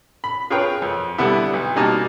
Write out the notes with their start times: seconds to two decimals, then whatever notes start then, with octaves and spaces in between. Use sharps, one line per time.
0.24 B5
0.50 F4 G#4 A#4 B4 C#5 G5
0.82 F2
1.18 D3 G3 B3 E4
1.53 B1
1.76 B2 G3 A#3 D#4 G#5 A5